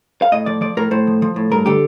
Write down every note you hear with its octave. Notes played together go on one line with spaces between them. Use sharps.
F5
A2 D#5
F3 D5
F3 D5
A2 A#4
A2 C5
F3
F3
A2
G2 A#4
D3 G4